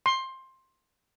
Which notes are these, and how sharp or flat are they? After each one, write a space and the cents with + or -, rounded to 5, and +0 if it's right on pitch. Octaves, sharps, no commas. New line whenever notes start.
C6 +15